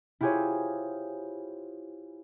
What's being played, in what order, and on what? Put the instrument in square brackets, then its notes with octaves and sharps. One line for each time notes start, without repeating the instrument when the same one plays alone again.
[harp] E4 F4 G4 G#4 C5 C#5